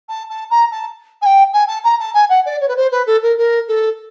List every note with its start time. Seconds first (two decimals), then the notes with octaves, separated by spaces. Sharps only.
0.09 A5
0.30 A5
0.50 A#5
0.72 A5
1.22 G#5
1.26 G5
1.53 G#5
1.68 A5
1.84 A#5
2.00 A5
2.14 G#5
2.29 F#5
2.46 D5
2.61 C#5
2.68 B4
2.76 C5
2.92 B4
3.06 A4
3.23 A#4
3.38 A#4
3.68 A4